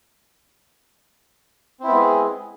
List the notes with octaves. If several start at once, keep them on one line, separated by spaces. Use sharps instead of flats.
G#3 B3 C4 E4 G#4